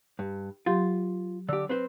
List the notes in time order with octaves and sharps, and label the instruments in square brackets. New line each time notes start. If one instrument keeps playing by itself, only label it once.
[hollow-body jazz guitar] G2
[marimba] F#3 G4 C6 [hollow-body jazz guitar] F4
[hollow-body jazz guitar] D3 G4 [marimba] E6
[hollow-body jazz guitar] C4 B4 C5